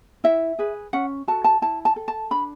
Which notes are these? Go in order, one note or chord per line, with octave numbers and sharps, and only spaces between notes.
E4 E5
G#4 B4
C#4 F#5
F#4 A4 A5
A5
E4 A5
A5
A4
A5
D4 B5